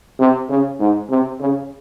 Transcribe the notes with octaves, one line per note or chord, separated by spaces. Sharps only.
C3
C#3
G#2
C3
C#3